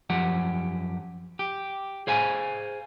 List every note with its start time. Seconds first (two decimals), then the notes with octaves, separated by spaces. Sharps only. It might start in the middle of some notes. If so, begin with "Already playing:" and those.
0.10 F#2 F3 G4 F#5
1.39 G4
2.07 G#4 C5 F5 G#5